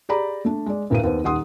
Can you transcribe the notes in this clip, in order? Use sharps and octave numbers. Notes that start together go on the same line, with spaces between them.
G4 G#4 D5 A#5 B5
A3 D4
G#3 D5
D2 A2 A#4 B4 F5 D#7
D#2 B3 C4
D#1 D#3 F#5 C6 D#6